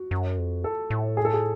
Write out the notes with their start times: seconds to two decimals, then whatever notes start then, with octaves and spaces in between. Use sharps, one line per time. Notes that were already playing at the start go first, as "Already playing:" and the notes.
Already playing: F#4
0.11 F#2
0.38 F2
0.64 A4
0.90 A2
1.17 G#4
1.25 A4
1.33 G#4